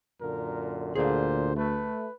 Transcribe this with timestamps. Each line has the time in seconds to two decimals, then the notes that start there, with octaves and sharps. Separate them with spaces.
0.21 F#2 A#2 D3 A#4
0.95 D2 A#2 D3 G#4 C5 F5
1.56 A3 B4